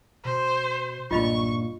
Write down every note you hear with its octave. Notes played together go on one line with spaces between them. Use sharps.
B2 C5
B1 G2 A#2 F4 D#5 B5 C#6